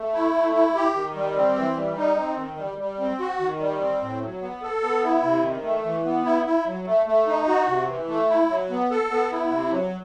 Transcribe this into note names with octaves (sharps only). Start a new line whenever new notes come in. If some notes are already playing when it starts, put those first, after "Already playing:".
Already playing: A3
E4
A3
E4
G4
D#3
G3
C4
E3
G3
D#4
C4
D#3
G3
G3
C4
F#4
D#3
G3
C4
A2
F#3
B3
A4
B3
E4
C3
D#3
A3
E3
B3
E4
E4
F#3
A3
A3
D#4
F#4
C3
E3
A3
E4
F#3
B3
A4
B3
E4
C3
F#3